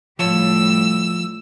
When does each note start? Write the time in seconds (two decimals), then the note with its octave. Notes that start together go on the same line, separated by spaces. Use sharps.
0.19 A2 F3 G3 C#5 A5 E6